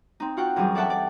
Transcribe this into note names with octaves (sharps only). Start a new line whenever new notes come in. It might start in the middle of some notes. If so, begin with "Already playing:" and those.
C4 D#4
F4 F#4 F#5 G5
F#2 E3 F#3 G3 G#4
A4 D5 E5 F#5 G5 A5
D5